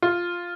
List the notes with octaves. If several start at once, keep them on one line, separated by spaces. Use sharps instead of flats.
F4